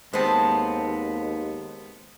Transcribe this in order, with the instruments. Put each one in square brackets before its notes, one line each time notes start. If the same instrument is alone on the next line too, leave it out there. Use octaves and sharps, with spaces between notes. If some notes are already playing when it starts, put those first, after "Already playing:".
[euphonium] D#2 [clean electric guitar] G#3 B3 C4 [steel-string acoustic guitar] C5 A5